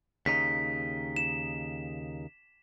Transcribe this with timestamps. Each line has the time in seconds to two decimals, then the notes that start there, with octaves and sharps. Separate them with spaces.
0.26 D#2 C#3 D#4 B6
1.16 E7